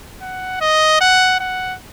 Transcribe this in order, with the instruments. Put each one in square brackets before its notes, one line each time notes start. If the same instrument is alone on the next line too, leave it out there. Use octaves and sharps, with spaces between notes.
[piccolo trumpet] F#5
D#5
F#5
F#5